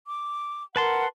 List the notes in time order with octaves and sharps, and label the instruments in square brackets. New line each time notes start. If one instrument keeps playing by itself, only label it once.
[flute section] D6
[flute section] A#4 F#5 [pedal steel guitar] B4 A5 C6